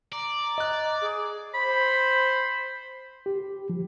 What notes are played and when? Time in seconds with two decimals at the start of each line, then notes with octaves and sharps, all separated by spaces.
0.12 D5 A#5
0.58 D#5 F#6
1.01 G#4
1.54 C5 B5
3.26 G4
3.70 F3